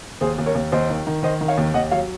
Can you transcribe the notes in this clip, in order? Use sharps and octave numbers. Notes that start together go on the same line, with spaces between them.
D#2 G#4 C5
D#2
A#4 C#5
D#2
D#2 C5 D#5
D#3
D#3
D#3 C5 D#5
D#3
C#5 F5
D#2
D#2 D#5 F#5
F#3 C#5 F5